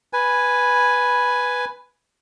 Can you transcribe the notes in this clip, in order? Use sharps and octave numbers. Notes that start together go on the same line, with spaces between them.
B4 G#5